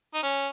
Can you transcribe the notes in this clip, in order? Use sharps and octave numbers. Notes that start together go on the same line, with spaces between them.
D#4
C#4